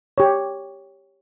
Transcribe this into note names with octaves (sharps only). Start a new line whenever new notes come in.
G4 C#5